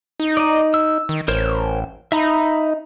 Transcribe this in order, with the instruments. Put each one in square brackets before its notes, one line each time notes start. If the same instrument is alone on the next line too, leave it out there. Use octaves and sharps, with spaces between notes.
[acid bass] D#4
[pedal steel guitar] D5 D#5
E6
[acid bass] D#3
[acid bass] A1 [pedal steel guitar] A#4 C5 C#5
[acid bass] D#4 [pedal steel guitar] E5 A#5 B5